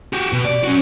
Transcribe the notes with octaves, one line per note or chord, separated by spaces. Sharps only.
F#4 G4
B2
D5
C#4 F#4